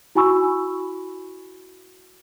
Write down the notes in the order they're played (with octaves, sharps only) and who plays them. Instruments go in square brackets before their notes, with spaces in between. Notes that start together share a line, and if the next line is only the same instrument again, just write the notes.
[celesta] E4 F#4 G#5 B5 C#6 E6